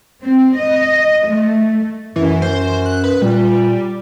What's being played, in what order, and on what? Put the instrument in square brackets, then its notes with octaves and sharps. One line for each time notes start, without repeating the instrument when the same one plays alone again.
[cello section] C4
D#5
A3
[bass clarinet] F#2 [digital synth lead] E3
[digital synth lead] C5
F#6
B4
[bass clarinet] A#2 [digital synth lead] G3